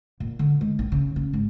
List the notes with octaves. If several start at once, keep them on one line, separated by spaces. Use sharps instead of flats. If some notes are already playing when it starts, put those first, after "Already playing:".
A#2
D3
G#3
A#1
C#3
C#4
G#1